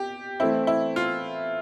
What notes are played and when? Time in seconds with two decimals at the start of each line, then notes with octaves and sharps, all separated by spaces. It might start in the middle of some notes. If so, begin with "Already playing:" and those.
Already playing: G4
0.40 E3 A3 C4 E4
0.67 E4
0.96 F4